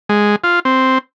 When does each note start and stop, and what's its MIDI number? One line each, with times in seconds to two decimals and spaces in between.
0.09 0.36 56
0.44 0.60 65
0.65 0.98 60